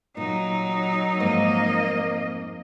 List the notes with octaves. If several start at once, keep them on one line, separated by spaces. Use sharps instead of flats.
A#2 F#3 D#4
F2 G#2 A#3 D#5